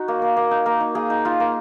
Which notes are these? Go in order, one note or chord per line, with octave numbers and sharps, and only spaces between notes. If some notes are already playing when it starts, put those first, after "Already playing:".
Already playing: D#4 F#4
A#3
A#3
A#3
D#4
A#3 A#4
D#4
A#3 G#4
D#4
D#4 F4
A#3